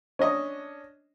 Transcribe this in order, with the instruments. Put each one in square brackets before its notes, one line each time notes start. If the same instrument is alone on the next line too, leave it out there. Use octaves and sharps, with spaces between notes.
[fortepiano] C#4 D4 D#5